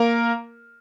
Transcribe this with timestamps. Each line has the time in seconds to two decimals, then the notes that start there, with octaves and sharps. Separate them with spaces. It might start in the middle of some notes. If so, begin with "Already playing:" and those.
Already playing: A#3 A#4